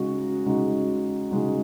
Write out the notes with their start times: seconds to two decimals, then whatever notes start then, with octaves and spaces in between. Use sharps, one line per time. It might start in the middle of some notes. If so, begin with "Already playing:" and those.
Already playing: C#3 G#3 D#4 F#4
0.46 C#3 G#3 D#4 F#4
1.31 C#3 G#3 D#4 F#4